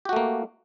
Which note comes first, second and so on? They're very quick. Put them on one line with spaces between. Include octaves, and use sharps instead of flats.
G4 F#4 A3 A#3